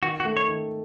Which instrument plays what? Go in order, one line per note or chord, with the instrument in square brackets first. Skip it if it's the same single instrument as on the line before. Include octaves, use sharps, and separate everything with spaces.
[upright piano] D#3 [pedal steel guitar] F#4
[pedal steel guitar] F#4
[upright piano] A3
[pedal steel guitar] C#5
[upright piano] D#3